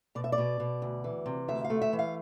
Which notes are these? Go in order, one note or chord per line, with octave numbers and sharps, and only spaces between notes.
B2 D5
E5
D5
B2
B2
D2
E3
C3
D2 E5
F5
A3
E5
E3
F5